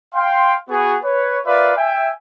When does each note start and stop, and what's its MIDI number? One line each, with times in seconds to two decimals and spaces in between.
0.14 0.55 77
0.14 0.55 79
0.14 0.55 84
0.69 0.96 59
0.69 0.96 66
0.69 0.96 68
1.03 1.39 71
1.03 1.39 73
1.46 1.72 65
1.46 1.72 70
1.46 1.72 71
1.46 1.72 74
1.46 1.72 76
1.46 1.72 77
1.77 2.11 76
1.77 2.11 79
1.77 2.11 80